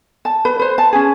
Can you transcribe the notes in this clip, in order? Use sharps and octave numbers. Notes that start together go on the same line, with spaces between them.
A5
B4
B4 C5
A5
C#4 G#4